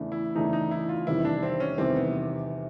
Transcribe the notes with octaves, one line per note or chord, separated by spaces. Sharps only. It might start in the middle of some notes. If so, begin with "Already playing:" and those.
Already playing: E2 C#3 E3 A3 D4
E4
E2 C#3 E3 A3 D4 D#4
D#4
E4
F4
F1 E2 C3 D#3 G3 E4
D4
C4
C#4
F1 E2 C3 D#3 G3 C4
B3